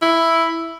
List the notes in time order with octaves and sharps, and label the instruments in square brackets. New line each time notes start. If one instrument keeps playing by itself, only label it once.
[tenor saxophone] E4